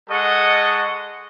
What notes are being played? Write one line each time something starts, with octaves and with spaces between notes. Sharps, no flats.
G#3 A4 D#5 F#5 C#6